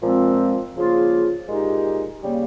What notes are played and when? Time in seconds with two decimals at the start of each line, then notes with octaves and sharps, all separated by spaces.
0.02 A#2 F3 G#3 C4
0.75 C#3 F3 A#3 F4 G#4
1.48 A#2 G#3 D#4 G4
2.22 C#3 G3 A#3